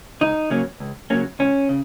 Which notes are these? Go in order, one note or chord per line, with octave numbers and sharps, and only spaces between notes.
C#2 D#4
C#3 F#3 A#3 C#4
C#2
C#3 F#3 A#3 C#4
C#2 C#4
C#3